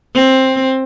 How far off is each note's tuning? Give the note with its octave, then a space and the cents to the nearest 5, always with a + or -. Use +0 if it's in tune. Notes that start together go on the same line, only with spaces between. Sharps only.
C4 +10